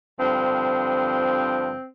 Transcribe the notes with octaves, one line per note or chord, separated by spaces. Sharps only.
G2 D3 F3 C4